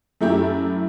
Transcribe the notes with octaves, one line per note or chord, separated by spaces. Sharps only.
F#2 A3 E4 G4